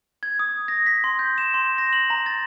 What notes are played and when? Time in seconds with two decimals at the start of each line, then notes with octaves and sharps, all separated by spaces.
0.23 G#6
0.39 D#6
0.68 A#6
0.86 B6
1.04 C6
1.19 G6
1.38 E7
1.54 C6
1.78 A#6
1.93 F#7
2.10 A#5
2.26 A6